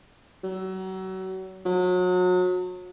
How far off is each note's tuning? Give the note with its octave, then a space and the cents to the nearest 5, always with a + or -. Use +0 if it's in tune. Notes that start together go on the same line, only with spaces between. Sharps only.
F#3 +30
F#3 -35